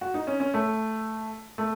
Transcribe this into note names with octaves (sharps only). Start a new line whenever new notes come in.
F#4
D#4
C#4
C#4
A3
A3